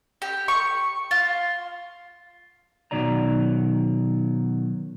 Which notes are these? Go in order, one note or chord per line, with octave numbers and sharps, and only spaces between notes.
G4
C#6
F4
B2 D#3 F#3 D5 A#5